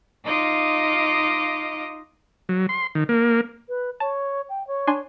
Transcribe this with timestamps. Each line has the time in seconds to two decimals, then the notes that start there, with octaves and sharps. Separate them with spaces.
0.24 D#4 F4 D#5 F5 D6
2.49 F#3
2.69 C6
2.95 D#3
3.09 A#3
3.69 B4
4.00 C#5 A5
4.49 G5
4.67 C#5
4.87 D4 G#5 C6